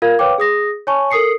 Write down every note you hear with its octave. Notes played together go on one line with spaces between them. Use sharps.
F4 A#4 F5 G#6
B4 C#5 F5 G5 D6
G#4 D#6 A#6
C#5 G#5 A5 C#6
A4 A#4 D#6 C7 C#7